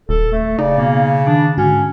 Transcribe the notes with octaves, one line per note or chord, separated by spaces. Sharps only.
D#1 A4
A3
C#3 D#4 D5
B2 A#3
D#3 D4 D6
G#2 D3 C#4 F#4